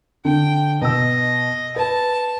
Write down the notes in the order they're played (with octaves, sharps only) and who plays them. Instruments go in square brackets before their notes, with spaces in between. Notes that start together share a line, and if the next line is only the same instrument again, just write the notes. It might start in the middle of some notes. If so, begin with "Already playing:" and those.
[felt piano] D3 [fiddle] G5
[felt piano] B2 E6 [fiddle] D#5
[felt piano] B4 [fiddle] A5